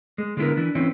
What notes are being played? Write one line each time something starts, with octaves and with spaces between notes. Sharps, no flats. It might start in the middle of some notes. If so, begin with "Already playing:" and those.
G#3
D3 G#3 A3 B3 E4 A#4
E3 D4 E4
E3 C4 C#4 E4 C5